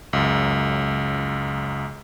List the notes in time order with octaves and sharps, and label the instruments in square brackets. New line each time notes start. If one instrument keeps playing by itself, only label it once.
[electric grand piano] C#2 F#2